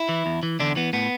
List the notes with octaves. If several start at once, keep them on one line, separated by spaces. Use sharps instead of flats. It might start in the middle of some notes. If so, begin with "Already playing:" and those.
Already playing: E4
E3
E2
E3
E2 D3 D4
E3 B3
A2 B3